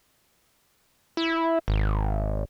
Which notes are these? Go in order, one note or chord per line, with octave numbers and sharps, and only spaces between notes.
E4
G#1